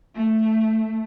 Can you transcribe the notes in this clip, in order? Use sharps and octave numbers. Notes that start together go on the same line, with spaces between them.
A3